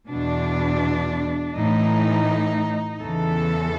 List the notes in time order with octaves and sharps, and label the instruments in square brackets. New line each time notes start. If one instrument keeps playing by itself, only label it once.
[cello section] E2 B2 D4
A2 E3 D#4
E2 C#3 E3 A4